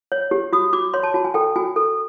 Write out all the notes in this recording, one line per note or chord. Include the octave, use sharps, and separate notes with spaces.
C#5
G4
F#4 D#6
F#4 D6
C#5 C6
A5
F#4 A5
G#5
A4 G5
F#4 G#5
A4